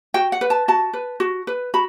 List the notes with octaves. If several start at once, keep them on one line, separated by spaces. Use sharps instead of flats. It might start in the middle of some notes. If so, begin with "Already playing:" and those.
F#4 G5
F#5
B4
A5
F#4 A5
B4
F#4
B4
F#4 B5